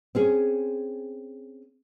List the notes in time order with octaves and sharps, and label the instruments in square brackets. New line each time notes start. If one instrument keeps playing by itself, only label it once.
[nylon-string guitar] C4 C#4 G#4